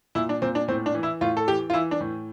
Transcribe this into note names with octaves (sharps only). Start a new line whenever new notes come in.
A#2 E4
D4
A#2 C4
D4
A2 C4
D4
E3
E4
A2 F4
A4
E3 G4
F4
E3 E4
D4
A2